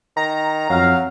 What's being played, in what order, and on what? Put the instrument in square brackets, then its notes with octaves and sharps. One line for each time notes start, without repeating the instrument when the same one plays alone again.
[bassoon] D#3 [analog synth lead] A#5
[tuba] F2 [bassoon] F#3 [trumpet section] F5